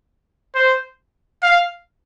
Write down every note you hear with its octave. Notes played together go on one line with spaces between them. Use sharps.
C5
F5